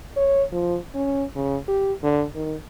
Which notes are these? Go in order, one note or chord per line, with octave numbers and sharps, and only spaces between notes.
C#5
F3
C#4
C#3
G4
D3
D#3